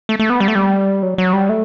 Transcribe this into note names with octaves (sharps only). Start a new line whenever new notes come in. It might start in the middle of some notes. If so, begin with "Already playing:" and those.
A3
A3
B3
G3
A3
G3
F#3
F#3
G3
A3